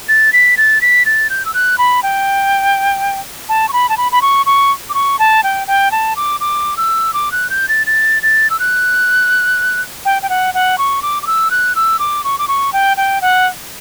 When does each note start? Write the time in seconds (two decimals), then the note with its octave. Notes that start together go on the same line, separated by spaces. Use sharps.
0.09 A6
0.33 B6
0.57 A6
0.81 B6
1.06 A6
1.30 G6
1.46 E6
1.54 F#6
1.78 B5
2.03 G5
3.49 A5
3.69 C#6
3.73 B5
3.89 A5
3.97 B5
4.12 B5
4.22 C#6
4.46 C#6
4.90 D6
4.94 C#6
5.19 A5
5.43 G5
5.68 G5
5.91 A5
6.16 D6
6.40 D6
6.77 E6
7.14 D6
7.32 F#6
7.50 G6
7.69 A6
7.87 A6
8.23 A6
8.50 E6
8.59 F#6
10.05 G5
10.22 G5
10.30 F#5
10.54 F#5
10.78 C#6
11.02 D6
11.23 D6
11.27 E6
11.51 F#6
11.76 E6
11.99 D6
12.24 C#6
12.38 D6
12.48 C#6
12.73 G5
12.97 G5
13.21 F#5